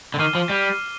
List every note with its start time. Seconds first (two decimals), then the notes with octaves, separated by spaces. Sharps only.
0.14 D3
0.19 D#3 D6 F6 C7 D#7 G7
0.35 F3
0.49 G3